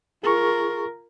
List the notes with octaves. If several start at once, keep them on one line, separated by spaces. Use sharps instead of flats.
F4 G#4 A#4 C#6